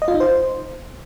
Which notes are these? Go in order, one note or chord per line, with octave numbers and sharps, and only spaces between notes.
D#5
F4
D#4
C5